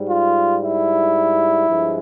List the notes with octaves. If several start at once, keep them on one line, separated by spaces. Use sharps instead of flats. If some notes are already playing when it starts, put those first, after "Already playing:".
Already playing: G#2 G3
F4
E4
G2 F3 G#3